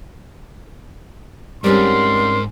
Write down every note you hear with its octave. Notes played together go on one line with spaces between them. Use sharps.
G#2 G3 C4 C#4 A#4 C6